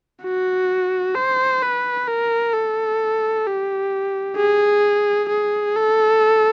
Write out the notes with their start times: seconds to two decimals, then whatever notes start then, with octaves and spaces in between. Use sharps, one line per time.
0.23 F#4
1.15 C5
1.62 B4
2.07 A#4
2.54 A4
3.46 G4
4.37 G#4
5.29 G#4
5.77 A4